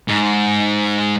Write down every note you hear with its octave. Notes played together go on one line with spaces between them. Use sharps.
G#2